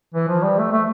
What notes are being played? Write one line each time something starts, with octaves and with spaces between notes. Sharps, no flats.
E3
F3
G3
A3
A3